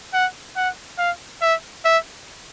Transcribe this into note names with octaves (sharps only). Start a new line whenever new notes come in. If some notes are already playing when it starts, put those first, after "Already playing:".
F#5
F#5
F5
E5
E5